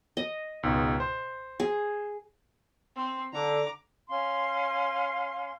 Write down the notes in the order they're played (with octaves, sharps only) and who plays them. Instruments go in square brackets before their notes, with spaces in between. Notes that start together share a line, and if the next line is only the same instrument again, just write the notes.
[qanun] D#5
[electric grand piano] C#2 G#2 B2
C5
[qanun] G#4
[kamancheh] C4 C6
[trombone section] D3 [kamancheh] A#5 D6
[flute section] C#4 F5 C6